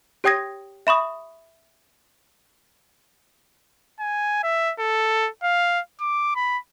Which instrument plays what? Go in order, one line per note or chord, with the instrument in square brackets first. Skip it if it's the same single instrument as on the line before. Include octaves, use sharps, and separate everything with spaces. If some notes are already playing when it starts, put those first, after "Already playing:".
[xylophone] G4 C#5 G5 D#6 G#6 A#6
E5 B5 C#6 D#6
[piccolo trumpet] G#5
E5
A4
F5
D6
B5